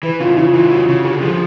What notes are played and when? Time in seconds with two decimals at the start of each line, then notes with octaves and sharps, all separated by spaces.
0.03 E3 B4
0.20 C#3 F4
0.37 C#3 E4
0.54 E3 F4
0.71 C#3 F#4
0.88 C#3 F#4
1.05 D3 G4
1.21 F3 G#4